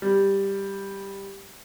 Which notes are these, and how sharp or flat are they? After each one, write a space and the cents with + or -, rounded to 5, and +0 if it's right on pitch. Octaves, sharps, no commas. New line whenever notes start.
G3 +5